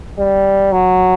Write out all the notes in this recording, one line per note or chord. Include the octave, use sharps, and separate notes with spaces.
G3
F#3